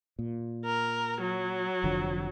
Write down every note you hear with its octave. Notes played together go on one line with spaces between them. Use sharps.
A#2
A#4
F#3
F1 D3 F3